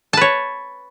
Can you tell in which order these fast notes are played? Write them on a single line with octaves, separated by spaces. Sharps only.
A5 B4 C#5